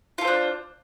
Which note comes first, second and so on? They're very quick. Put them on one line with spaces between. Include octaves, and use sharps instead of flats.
F4 A4 C5 D4